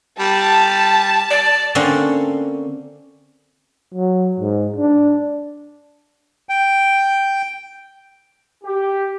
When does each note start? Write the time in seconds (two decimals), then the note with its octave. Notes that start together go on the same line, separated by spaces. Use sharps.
0.19 G3 A5
1.30 D5
1.75 D3 A#3 C4 C#4
3.94 F#3
4.40 G#2
4.76 D4
6.49 G5
8.64 G4